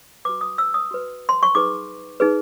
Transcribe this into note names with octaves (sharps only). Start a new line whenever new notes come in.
F#4 B4 D6
D#6
E6
D#6
F#4 B4
C6
C#6
D#4 G#4 B4 D6
D#4 G#4 B4